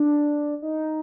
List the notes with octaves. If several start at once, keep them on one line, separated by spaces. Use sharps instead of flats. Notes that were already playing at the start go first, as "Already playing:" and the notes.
Already playing: D4
D#4